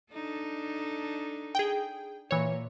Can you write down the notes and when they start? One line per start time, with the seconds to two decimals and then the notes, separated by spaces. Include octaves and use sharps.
0.13 D4 D#4 A4
1.55 G#4 G5
2.31 A#2 E3 C#5